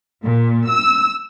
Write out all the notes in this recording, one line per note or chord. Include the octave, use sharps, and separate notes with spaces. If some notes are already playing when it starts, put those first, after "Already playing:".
A#2
E6